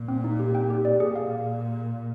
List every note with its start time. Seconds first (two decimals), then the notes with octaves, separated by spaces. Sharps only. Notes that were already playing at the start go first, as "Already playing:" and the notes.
Already playing: A#2
0.08 C4
0.24 D#4
0.39 G4
0.55 G5
0.70 G4
0.85 D5
1.00 A#2 G#4
1.15 F5